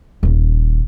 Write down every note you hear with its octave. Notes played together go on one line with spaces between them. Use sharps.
D#1